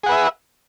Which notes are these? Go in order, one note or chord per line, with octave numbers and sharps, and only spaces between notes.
G#4 B4 E5 F#5